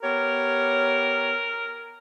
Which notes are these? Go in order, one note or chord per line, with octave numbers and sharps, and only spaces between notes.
B3 G4 A#4 C#5